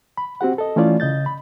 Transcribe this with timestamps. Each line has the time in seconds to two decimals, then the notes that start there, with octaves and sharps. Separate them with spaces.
0.17 B5
0.41 C4 F#4 G4 F#5
0.58 A4 D#5
0.76 E3 A3 C#4 E4 F4 D5
1.00 C#3 D#5 G6 A6
1.26 B5